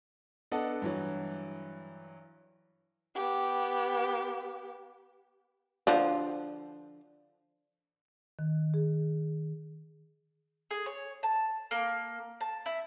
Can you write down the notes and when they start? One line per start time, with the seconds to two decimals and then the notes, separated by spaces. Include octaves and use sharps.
0.52 B3 D4 A4 D#5 F#5 A5
0.82 G2 E3 F#3
3.15 B3 G4
5.87 D3 F3
8.39 D#3
8.74 G#4
10.71 G#4
10.86 C#5
11.23 A5
11.71 A#3
12.41 A5
12.66 E4